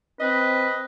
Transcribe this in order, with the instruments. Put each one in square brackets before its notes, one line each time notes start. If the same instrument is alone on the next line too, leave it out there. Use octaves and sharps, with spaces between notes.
[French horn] C4 [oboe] B4 [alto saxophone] D#5